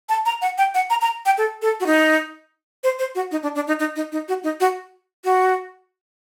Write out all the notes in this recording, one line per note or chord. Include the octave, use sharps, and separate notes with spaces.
A5
A#5
F#5
G5
F#5
A#5
A#5
G5
A4
A4
F#4
D#4
C5
C5
F#4
D#4
D4
D4
D#4
D#4
D#4
D#4
F#4
D#4
F#4
F#4